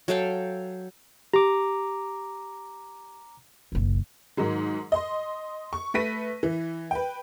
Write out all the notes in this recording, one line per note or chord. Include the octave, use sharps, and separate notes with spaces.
F#3 A4 F5 G5
G4 A#5 D6
F#1 B1
G#2 D#3 F#3 G#3
D#5 C6
C#6
A3 B4 A#6 B6 D#7
E3
B4 G5